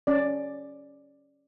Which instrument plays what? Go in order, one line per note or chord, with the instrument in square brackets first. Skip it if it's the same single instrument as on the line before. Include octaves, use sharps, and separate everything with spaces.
[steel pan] C#4 D5